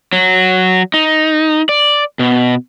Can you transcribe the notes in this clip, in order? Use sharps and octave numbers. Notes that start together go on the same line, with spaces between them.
F#3
D#4
D5
B2